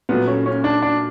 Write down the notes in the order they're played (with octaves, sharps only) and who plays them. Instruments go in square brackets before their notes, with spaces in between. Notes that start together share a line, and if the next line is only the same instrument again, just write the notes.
[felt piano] A#2 F#3 A3 [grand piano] B3
[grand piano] C#4
C#4
D4
D4